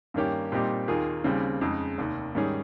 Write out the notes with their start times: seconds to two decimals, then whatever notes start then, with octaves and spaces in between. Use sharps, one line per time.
0.14 G2 D#3 A#3 C#4 G4
0.52 A#2 G3 C4 D#4 G4
0.88 D#2 D#3 A#3 F4 G#4
1.24 D#2 C#3 G3 C4
1.61 F2 C#3 G#3 D#4
1.98 F1 D#2 D#3
2.35 G#2 D#3 G3 C#4 G#4